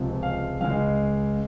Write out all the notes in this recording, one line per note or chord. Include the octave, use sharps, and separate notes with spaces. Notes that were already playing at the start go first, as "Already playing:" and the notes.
Already playing: C#2 C3 F3 G#3
F5
C#2 C#3 G#3 F5